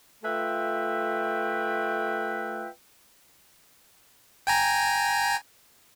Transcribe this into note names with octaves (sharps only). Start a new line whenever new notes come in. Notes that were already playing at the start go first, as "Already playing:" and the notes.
A3 F4 B4 E5 G5
G5 G#5 A#5